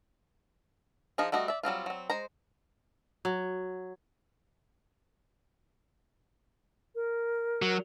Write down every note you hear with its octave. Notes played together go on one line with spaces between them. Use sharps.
F3 D#4 F4 G#4
G3 A3 F#4 D#5
D5 E5
F#3 G3 C4 F4
F#3 C4
G#3 C5 A#5
F#3
A#4
F#3